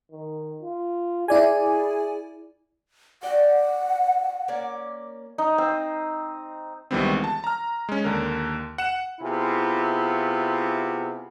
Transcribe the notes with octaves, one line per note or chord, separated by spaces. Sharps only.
D#3
F4
E4 G#4 D5 G#5
D5 F#5 G5
A#3 C#4 D5
D#4
C4
C#2 D#3 E3 G3 B3 C4
A5
A#5 F6
G#3 C#4
D#2 D3 A#4
F#5 E7
C3 B3 E4 F4 G#4